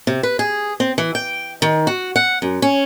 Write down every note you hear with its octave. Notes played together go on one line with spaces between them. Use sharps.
C3
B4
G#4
C4
E3
G5
D#3
F#4
F#5
F#2
C#4